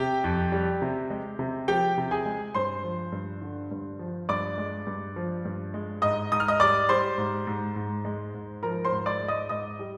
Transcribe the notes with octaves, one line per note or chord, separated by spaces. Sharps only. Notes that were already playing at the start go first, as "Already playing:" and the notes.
Already playing: C3 G4 G5
F2
G3
C3
G#3
C3
F3 G4 G5
C3
G#4 G#5
G#3
G2 C5 C6
F3
G2
D3
G2
F3
G2 D5 D6
G#3
G2
F3
G2
G#3
G#2 D#5 D#6
G#2 D#6
F6
D#5 D#6
G3 D5 D6
G3 C5 C6
G#2
G#2
G#2
G#3
G#2
F3 A#4 A#5
C5 C6
G#2
D5 D6
G#3
D#5 D#6
G#2 D#5 D#6
G3